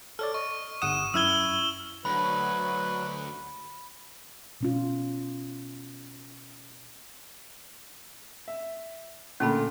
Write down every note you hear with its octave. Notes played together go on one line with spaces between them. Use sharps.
A4 C#5 D5 F6
D#5 C#6
G1 F#5 D#6 E7
F#2 E4 E6 F6 G#6 G7
D2 F#3 B4 B5
B2 C#4 F4
E5
A#2 D3 A3 C#4 A5 B5